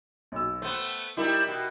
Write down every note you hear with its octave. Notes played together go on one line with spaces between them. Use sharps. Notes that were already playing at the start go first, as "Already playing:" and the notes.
B1 E6
A3 B3 C5
G3 D#4 E4 A#4
B2